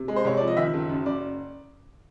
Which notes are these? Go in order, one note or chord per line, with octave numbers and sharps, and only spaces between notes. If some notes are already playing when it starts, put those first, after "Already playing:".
Already playing: C3
G#3
C5
C2 C#5
F3 D5
D#5
D#3 E5
F#1
F#2
F#1 D5